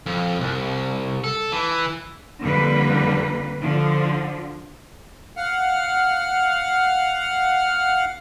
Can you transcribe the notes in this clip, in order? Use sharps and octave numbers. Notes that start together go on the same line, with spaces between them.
F2
C2
A4
E3
F2 D3 G3 A#3 B4
D3 F3
F5 F#5 F6